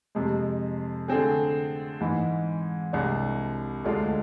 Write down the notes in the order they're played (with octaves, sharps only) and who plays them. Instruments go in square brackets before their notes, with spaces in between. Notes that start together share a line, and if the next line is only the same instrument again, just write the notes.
[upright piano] F2 C3 G#3
D3 A3 C4 G#4
G#2 E3 G#3
C2 C3 G#3 D4
D2 D3 G#3 D4 F4